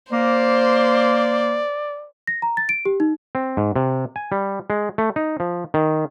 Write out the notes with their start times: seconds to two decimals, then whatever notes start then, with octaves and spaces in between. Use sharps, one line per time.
0.12 A#3 C5 D5
2.27 A#6
2.42 A#5
2.57 A6
2.69 D7
2.85 G4
3.00 D#4
3.35 C4
3.57 G#2
3.76 C3
4.16 G#5
4.32 G3
4.70 G#3
4.98 A3
5.16 D#4
5.40 F3
5.74 D#3